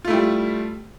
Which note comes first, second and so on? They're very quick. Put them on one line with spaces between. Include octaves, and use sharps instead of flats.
F4 A3 E4 G3